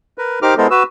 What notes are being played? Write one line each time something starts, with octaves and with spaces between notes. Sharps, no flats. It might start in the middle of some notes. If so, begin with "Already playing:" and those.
A#4 B4
D#4 G4 A#4 C5 D6 F6
G#3 B3 E4 A4 A#4 C5
F#4 B4 E6